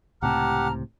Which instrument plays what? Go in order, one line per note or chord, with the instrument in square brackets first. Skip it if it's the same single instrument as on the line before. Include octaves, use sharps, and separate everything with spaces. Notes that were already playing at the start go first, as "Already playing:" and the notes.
[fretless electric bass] C#2 A2 C3 [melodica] G4 F#5 [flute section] A5 A#5 F6